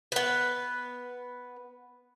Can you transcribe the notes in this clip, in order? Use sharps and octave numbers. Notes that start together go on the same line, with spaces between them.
B3 B4